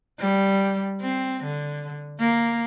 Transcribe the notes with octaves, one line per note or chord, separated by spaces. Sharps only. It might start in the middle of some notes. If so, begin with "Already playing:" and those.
G3
C4
D3
A#3